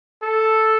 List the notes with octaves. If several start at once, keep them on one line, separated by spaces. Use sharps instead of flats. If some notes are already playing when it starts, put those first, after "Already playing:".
A4